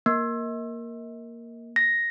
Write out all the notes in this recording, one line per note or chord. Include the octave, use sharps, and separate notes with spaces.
A#3
A#6